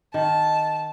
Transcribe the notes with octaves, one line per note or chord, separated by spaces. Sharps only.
D#3 A5